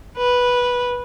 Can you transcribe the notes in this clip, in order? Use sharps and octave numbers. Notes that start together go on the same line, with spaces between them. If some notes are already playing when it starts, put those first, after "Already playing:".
B4